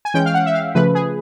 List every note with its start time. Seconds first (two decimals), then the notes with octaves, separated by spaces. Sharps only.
0.05 G#5
0.14 E3 G#3 C#4 G5
0.26 F5
0.34 F#5
0.46 E5
0.54 F5
0.75 C#3 F3 A3 B4
0.95 G#4